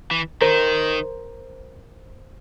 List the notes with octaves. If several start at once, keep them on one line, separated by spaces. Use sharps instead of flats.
E3
D#3 A#4 C5